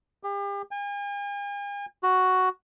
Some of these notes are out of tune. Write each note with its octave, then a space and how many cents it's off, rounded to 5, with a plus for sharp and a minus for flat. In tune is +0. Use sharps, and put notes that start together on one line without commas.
G4 +40
G#5 -45
F#4 +5